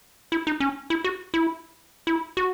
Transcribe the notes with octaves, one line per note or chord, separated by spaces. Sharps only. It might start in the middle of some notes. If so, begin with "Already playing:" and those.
E4
D#4
C#4
E4
F#4
E4
E4
F#4